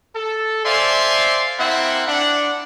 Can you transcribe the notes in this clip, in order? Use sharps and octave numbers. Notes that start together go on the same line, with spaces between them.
A4
C5 D5 E5 F5 G#5 C6
A#3 C4 E4 E5 F#5
D4 F#5